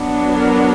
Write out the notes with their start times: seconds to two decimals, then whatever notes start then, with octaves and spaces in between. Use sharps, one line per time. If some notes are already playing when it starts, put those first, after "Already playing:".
Already playing: F#3 B3 D4
0.36 A#4